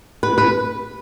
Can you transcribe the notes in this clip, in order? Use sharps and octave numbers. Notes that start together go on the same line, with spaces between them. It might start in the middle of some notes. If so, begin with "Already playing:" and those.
B4
B4